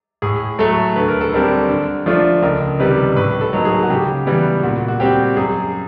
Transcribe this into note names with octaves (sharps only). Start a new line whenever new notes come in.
A2 G#4
F#3 A3 A4
D2 B4
A#4
A4
D3 G3 C4 A#4
D3
F3 A3 D4 F4
C#2 A#4
C3 D#3 G3 B4
A2 B4
A4
F#3 A#3 D#4
G#4
F#4
C#3 G4
E3 G3 B3
A#2 F#4
F#4
G3 C4 G4
F#2 G#4